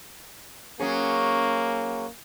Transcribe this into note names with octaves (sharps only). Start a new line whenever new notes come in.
F#3 A#3 C#4 G#4